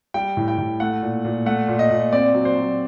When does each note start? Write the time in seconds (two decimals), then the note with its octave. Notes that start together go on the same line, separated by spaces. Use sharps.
0.14 G3 G5
0.37 A2
0.48 G5
0.58 A2
0.80 A3 F#5
1.02 A#2
1.25 A#2
1.46 A3 F#5
1.68 A#2
1.79 D#5
1.90 A#2
2.13 C4 D5
2.34 F#3
2.45 C5
2.55 F#3